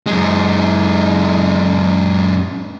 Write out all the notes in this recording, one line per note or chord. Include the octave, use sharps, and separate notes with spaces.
F#2 G#3